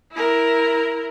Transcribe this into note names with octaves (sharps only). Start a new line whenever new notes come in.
E4 A#4